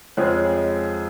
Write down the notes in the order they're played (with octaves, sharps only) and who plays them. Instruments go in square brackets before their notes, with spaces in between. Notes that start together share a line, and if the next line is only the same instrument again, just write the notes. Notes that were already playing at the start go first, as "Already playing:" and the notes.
[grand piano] F2 C#3 G#3 C4 [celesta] C#5
[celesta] C5
C#5
D#5